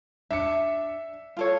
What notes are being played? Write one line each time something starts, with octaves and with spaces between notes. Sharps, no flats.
D4 E5 C#7
F4 A4 C#5